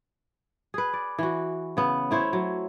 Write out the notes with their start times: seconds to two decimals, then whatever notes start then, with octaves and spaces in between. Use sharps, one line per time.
0.74 G#4 B4
0.93 D5
1.19 E3 F#4
1.77 C#3 B3
2.11 A3 E4 C5 C#5
2.33 F#3